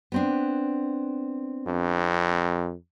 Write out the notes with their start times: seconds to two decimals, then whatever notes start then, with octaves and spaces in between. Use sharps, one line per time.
0.12 B3 C4 D4
1.67 F2